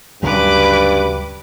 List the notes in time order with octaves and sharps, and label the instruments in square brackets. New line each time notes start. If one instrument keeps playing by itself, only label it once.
[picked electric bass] D2 C#3 F#3 [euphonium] G2 [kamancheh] B4 D6